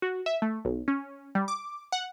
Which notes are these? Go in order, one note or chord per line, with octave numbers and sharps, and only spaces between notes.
F#4
E5
A3
B1
C#4
G3
D6
F#5